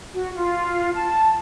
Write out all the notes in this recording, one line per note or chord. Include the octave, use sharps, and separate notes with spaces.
F#4
F4
A5